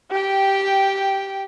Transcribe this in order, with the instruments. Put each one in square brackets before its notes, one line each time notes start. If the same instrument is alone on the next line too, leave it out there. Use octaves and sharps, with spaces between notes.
[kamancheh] G4 G5